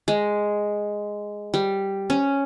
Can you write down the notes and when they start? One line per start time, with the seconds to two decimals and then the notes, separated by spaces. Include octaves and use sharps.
0.08 G#3
1.54 G3
2.10 C#4